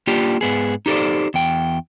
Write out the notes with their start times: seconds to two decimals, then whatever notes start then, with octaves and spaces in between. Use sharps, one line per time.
0.07 A#3 D4 F4 G4
0.41 G#2 B3 G#4
0.86 D#4 G4 A4 C5 D5
1.34 E2 G5